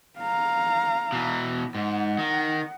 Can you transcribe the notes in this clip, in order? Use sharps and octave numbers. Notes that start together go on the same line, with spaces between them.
F5 A#5
B2 E3
G#2 F#5
D#3